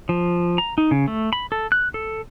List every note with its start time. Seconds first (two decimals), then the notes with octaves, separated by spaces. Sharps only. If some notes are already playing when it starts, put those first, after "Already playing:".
0.09 F3
0.58 A#5
0.78 D#4
0.91 C#3
1.08 A3
1.33 B5
1.52 A4
1.72 F#6
1.94 A4